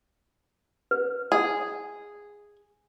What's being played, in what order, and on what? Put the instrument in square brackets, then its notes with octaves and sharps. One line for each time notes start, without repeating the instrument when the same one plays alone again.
[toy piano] B4
[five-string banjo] G#4